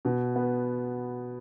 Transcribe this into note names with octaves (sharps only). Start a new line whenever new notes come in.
B2
B3